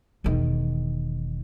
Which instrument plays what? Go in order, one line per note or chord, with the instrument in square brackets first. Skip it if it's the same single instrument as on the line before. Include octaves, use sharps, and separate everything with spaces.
[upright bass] E1 D#3